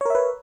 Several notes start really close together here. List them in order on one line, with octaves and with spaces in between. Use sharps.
C#5 A#4 E5 B4